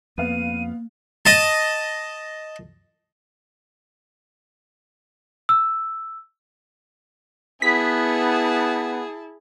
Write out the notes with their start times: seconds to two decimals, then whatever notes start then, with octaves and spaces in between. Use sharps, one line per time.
0.18 F2 A#3 B3 F5 D#7
1.26 D#5 A5
5.49 E6
7.62 B3 E4 G#4 A5 B6